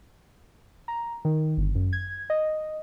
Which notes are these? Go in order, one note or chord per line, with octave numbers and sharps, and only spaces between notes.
A#5
D#3
G1
F#2
G#6
D#5